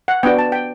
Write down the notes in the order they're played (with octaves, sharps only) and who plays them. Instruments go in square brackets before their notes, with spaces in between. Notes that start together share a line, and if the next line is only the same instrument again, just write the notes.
[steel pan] F#5
B3 D4 F#4 G5
A5
G5